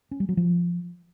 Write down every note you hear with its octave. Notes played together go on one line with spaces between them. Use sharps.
C#4
G3
F#3
F3